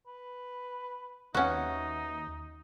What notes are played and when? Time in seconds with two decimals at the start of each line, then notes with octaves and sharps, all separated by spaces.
0.07 B4
1.35 D#2 C#4 D#4 F#4 B4 E5 F#5